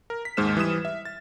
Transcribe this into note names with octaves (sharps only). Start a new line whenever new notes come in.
A#4
B6
D#2 G#2 G#3 C5 F6 E7
E3 G3 D#6 E7
E5
A6